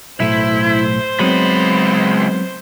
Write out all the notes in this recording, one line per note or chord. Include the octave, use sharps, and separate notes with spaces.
B1 A2 E4 C5
C#2 F#3 G#3 B3 C4 D#4 B5